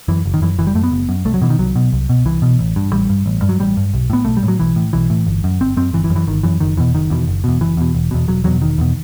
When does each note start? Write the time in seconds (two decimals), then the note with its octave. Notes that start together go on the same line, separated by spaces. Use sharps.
0.08 F#2 E3
0.26 F#1
0.34 D#3
0.42 F#2 E3
0.58 F#1 E3
0.67 G3
0.75 F#2 A3
0.84 B3
0.92 F#1
1.09 F#2
1.25 C2 A3
1.34 F#3
1.42 B2 E3
1.50 D#3
1.59 C2 F#3
1.76 B2
1.92 C2
2.09 B2
2.25 C2 E3
2.42 B2
2.59 A1
2.76 G2
2.93 A1 G3
3.10 G2
3.26 A1
3.42 G2
3.49 F#3
3.60 A1 G3
3.77 G2
3.93 B1
4.10 A2 B3
4.25 B1 A3
4.37 G3
4.43 A2
4.48 F#3
4.59 B1 E3
4.76 A2
4.93 B1 E3
5.10 A2
5.26 G1
5.44 F#2
5.60 G1 C4
5.77 F#2 C4
5.93 G1 E3
6.04 E3
6.10 F#2
6.16 E3
6.27 G1 D#3
6.43 F#2 E3
6.60 F#1 D#3
6.77 E2 B2 E3
6.94 F#1 D#3
7.10 E2 B2
7.27 F#1
7.44 E2 B2
7.61 F#1 E3
7.77 E2 B2
7.95 E1
8.11 E2 B2
8.28 E1 F#3
8.44 E2 B2 F#3
8.61 E1 D#3
8.78 E2 B2